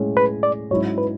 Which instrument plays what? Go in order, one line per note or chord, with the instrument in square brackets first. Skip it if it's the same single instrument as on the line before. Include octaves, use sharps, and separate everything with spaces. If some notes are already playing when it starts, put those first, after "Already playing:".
Already playing: [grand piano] A2 G#3 C#4
[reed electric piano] B4
D5
[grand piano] G#2 F#3 C#4 E4 [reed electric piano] C#5
[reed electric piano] B4